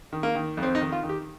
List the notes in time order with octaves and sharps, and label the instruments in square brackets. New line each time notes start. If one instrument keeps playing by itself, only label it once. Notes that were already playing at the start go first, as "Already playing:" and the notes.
[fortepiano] D#3
A#3
D#3
F2
C4
D#4
D#3
F4
D#3
G4